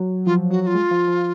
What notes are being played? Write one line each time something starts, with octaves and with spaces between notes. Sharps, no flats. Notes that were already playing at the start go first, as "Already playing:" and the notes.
Already playing: F#3
F3 F4
F#3 F#4
F#4
F4
G#3
F3
F3